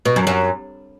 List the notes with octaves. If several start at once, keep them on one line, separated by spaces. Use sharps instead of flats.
B2
F#2
F#2